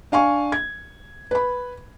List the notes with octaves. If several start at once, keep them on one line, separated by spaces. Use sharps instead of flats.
D4 F5 G#5 C#6
G#6
B4 B5